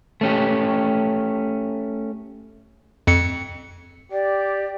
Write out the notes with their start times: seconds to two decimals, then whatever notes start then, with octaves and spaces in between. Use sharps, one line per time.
0.21 A3 C#4 G4
3.07 F2 C#7
4.12 G4 D5